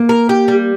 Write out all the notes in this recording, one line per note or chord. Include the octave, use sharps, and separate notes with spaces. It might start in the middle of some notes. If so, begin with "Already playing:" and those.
Already playing: A#3
A#4
G4
G3